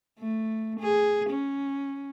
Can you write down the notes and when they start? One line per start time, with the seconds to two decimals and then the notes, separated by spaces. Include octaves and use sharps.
0.19 A3
0.80 G#4
1.30 C#4